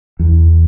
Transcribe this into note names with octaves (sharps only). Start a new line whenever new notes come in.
E2